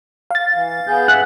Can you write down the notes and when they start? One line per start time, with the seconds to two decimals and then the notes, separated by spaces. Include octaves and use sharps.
0.31 F5 A6
0.54 E3
0.87 B3 G#4 G6
1.08 G2 E5 F#5 F#6